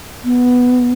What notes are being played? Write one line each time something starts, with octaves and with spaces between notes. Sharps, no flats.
B3